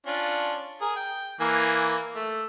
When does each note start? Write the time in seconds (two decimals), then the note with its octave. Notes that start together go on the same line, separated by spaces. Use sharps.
0.06 C#4 D4 F4
0.81 G#4 A#4
0.96 G5
1.41 E3 A#3 G#5
2.16 A3 E6